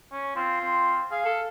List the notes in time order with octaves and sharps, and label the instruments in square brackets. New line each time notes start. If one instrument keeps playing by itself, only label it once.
[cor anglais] C#4
[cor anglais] C4 [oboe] F4
[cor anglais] C4
[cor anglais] G#4 [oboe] F5
[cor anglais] A4